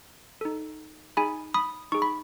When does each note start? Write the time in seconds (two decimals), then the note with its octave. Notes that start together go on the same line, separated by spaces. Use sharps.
0.41 D#4 A4
1.17 D#4 G#4 G#5 B5
1.54 B5 D#6
1.92 D#4 G#4 C#6
2.02 B5